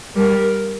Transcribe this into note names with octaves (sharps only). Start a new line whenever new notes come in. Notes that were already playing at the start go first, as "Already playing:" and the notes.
G3 A#4